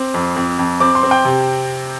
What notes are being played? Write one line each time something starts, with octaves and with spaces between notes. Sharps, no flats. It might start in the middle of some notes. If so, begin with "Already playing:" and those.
Already playing: C4 D6
F2
F2
F2
C4 D6
C6
C4
G5
C3